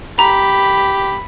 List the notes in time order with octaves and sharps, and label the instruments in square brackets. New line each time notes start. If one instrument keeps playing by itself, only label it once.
[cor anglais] G4 [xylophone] A#5 [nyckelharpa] B5